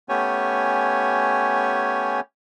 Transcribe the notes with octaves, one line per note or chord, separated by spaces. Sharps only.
A3 B3 C#4 G4 C#5 G#5